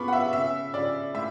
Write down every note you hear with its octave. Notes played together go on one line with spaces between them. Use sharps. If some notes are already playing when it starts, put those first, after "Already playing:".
Already playing: C#3 B3 B5 C#6 D6
F#5
E5
C#3 E5
C#3 D5
A2 E5